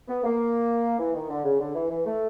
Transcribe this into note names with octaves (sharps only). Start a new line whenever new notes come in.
B3
A#3
E3
D#3
D3
C#3
D3
E3
E3
A3